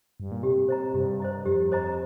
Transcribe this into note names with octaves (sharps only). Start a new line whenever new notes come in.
G2
A#2
C3 G4
C5 D#5 A#5
G2 G4
C5 D#5 A#5
F2 G4
C5 D#5 A#5